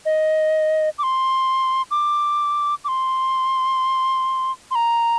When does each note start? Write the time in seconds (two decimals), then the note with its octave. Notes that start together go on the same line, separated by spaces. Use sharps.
0.06 D#5
0.98 D6
1.03 C6
1.91 D6
2.84 D6
2.88 C6
4.71 C6
4.75 A#5